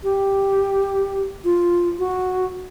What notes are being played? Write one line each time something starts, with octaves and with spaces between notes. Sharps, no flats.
G4
F4
F#4